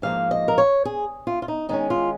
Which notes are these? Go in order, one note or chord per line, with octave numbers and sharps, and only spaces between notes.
G#2 F3 A#3 F5
D#5
A#4
C#5
G#4
F4
F4
D#4
D#3 G#3 C#4 D#4
F4